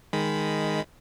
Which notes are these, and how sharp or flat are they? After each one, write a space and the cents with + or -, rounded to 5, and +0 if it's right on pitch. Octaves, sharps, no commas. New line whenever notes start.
D#3 +0 G#3 +0 B5 +0